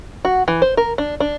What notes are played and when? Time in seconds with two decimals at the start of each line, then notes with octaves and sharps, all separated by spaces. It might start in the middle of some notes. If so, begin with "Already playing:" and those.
0.25 F#4
0.48 E3
0.62 C5
0.77 A#4
0.98 D4
1.20 D4